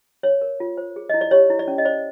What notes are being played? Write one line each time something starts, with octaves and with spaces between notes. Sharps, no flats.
C#5
A#4
F4
C5
G#4
E4 D#5
D5
G4 C#5
E4
D5
C#4
D#5
C5 D5